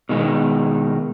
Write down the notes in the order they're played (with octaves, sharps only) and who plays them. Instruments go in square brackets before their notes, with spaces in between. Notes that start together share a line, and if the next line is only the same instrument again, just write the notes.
[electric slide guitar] B2 D#3 G#3